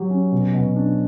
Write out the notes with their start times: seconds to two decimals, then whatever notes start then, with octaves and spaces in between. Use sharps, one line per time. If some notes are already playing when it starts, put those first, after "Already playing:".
Already playing: F#3 G4
0.10 C#4
0.32 B2
0.54 B2
0.75 D4